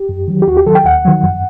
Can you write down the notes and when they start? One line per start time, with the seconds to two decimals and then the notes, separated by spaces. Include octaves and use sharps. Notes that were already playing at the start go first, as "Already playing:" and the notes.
Already playing: G4
0.09 F#2
0.28 D#3 F#3
0.42 G4
0.47 D#2 F#4
0.57 G4
0.66 D#3 F#3 A4
0.75 G5
0.85 D#2 F#5
1.05 D#3 F#3
1.23 F#2